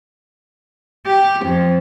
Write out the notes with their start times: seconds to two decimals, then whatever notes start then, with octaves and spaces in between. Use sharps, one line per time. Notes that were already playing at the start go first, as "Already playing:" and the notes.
1.06 G4
1.45 F2